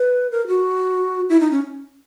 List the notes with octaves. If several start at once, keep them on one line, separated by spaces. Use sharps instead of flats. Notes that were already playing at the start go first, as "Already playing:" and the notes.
Already playing: B4
A#4
F#4
E4
D#4
C#4